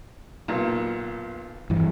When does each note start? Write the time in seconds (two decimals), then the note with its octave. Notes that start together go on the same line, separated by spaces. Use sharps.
0.48 B1 A#2
1.70 G2 E3